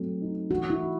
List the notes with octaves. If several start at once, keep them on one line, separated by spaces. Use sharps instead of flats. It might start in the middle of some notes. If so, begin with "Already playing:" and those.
Already playing: F#3 A3 C4
D#4
E3 F#4
E4
F#4